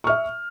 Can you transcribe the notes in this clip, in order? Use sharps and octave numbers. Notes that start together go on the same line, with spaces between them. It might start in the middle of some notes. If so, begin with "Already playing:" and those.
E5 C#6 F6